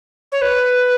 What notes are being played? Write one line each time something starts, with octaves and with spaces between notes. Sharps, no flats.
C#5
B4